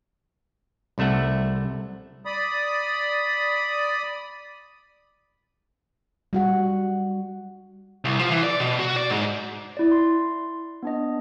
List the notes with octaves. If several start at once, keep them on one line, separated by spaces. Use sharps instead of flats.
C2 C3 A3 E5 F#5
D5 B5 D#6
G3 F#4 F#5
C2
F3
E3
D5
B2
F#4
D5
G#2
E4 D5
C6
B3 D4 D#5